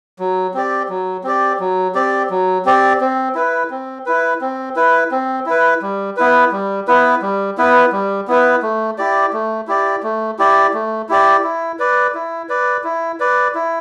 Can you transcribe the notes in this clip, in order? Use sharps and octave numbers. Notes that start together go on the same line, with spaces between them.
F#3
C4 G4 D5
F#3
C4 G4 D5
F#3
C4 G4 D5
F#3
C4 G4 D5
C4
E4 B4
C4
E4 B4
C4
E4 B4
C4
E4 B4
G3
B3 E4 B4
G3
B3 E4 B4
G3
B3 E4 B4
G3
B3 E4 B4
A3
E4 G4 D5
A3
E4 G4 D5
A3
E4 G4 D5
A3
E4 G4 D5
E4
B4 D5
E4
B4 D5
E4
B4 D5
E4